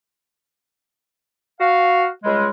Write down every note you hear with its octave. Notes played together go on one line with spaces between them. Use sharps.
F#4 F5
C#2 G3 G#3